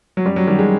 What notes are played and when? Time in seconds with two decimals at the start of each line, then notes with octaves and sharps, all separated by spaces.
0.17 F#3
0.25 F#2 G3
0.36 F#3
0.47 D#3 G3
0.59 G#3